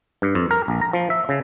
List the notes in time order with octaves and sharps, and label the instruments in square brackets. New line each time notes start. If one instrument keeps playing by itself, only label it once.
[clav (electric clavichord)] G2
F2
A#4
A#1
A#5
F3
E5
C#3